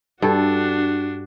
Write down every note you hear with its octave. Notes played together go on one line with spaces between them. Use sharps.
G2 D4 F#4 A4